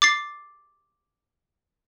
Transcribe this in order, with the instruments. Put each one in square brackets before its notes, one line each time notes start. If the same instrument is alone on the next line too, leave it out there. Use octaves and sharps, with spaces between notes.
[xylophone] D6 A6 C7